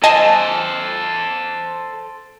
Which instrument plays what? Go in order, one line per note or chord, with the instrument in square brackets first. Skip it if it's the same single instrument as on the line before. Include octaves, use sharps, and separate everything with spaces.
[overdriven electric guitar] A4 C5 [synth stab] D#5 G#5 A5